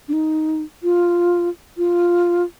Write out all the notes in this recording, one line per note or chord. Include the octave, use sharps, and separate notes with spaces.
D4
D#4
F4
F4